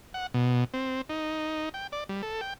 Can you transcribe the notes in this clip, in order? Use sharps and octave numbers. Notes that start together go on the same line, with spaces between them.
F#5
B2
C4
D#4
G5
D5
G3
A4
G5